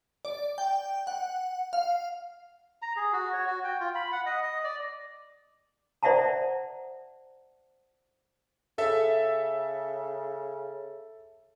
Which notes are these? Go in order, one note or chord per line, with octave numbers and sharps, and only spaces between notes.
D5
G5
F#5
F5
A#5
G#4
F#4
C#5
F#4
G5
F4
B5
F#5
D#5
D#5
D5
C5 D5 E5 F#5 A5 A#5
C#3 A4 E5